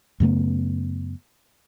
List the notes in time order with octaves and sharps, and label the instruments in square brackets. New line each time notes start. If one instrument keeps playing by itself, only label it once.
[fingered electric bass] F#2 C#3 A3 B3